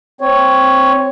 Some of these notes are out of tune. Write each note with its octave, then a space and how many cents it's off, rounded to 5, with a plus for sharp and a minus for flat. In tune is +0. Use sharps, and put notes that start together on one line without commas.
C4 +0 C#5 +0